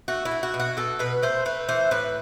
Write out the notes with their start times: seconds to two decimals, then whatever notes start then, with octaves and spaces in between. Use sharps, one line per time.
0.08 A3 F#4
0.25 E4
0.31 A3
0.43 F#4
0.54 B2
0.60 F#4
0.77 B2 A4
0.99 B2 B4
1.22 A3 C5
1.45 A3 B4
1.69 E3 C5
1.91 A2 B4